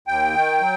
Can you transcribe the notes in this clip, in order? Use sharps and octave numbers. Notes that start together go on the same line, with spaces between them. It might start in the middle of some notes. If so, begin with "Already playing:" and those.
D#2 G5
D#3
F#3